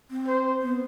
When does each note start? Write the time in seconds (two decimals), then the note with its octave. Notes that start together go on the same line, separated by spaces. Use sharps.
0.10 C4
0.27 C5
0.61 B3